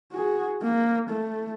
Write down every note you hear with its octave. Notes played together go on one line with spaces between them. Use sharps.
F#4 G#4
A#3
A3